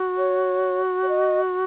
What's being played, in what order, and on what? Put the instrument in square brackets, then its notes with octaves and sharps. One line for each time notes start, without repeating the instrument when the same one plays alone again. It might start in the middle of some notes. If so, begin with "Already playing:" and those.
Already playing: [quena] F#4
[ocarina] C#5
C#5
D#5